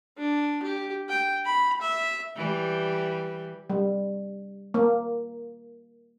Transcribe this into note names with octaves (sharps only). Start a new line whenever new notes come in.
D4
G4
G5
B5
E5
E3 G3
G3
A#3